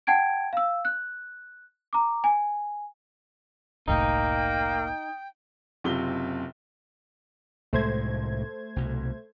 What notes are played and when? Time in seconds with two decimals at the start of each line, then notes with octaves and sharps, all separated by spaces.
0.07 F#5 G5 A5 G#6 D7
0.53 F5 E6
0.85 F#6
1.93 A#5 D6
2.24 G#5
3.88 F#1 C2 A2 A#3 D#4 G5
5.84 F#1 C3 F4 G7
7.73 C2 A2 G#3 A3 C5 G#6
8.76 C2 B2